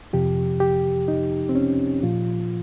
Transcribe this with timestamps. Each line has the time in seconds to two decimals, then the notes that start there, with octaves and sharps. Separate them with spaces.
0.13 F2 C3 F3 G4
0.60 G4
1.08 D#4
1.49 C4
1.55 C#4
2.03 A#2 F3 F4